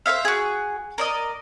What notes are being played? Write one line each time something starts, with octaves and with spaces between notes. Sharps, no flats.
C5 C#5 E5 F5
F#4 G#4
A#4 D5 D#5